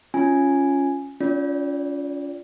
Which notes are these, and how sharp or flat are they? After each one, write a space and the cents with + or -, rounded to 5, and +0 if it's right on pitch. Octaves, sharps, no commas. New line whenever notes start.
C#4 +0 F4 -5 G#5 +0
C#4 +35 F4 +0 D5 -15